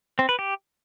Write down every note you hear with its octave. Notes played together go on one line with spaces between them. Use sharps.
C4
B4
G4